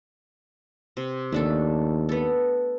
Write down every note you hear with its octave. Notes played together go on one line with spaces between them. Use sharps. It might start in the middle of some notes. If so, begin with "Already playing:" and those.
C3
D#2 A3 D4 A4
B3 A4